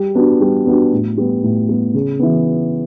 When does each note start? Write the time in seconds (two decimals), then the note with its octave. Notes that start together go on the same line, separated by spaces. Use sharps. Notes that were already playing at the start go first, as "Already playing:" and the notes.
Already playing: G3
0.15 B3 D4 F#4
0.41 G3
0.66 B3 D4 F#4
0.92 A2
1.18 G3 B3
1.43 A2
1.69 G3 B3
1.94 C#3
2.19 E3 B3